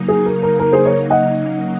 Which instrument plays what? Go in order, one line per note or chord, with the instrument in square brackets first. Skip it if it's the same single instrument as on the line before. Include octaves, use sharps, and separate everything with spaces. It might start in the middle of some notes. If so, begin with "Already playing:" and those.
Already playing: [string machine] C#3 F#3 A#3 D#4
[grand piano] G#4
A#4
A#4
A#4
G#4 C5
A#4 C#5
D#5 F#5